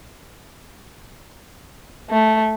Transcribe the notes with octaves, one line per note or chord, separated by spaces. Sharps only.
A3